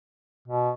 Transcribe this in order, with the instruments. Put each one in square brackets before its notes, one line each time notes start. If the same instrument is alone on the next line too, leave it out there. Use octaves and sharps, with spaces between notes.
[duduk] B2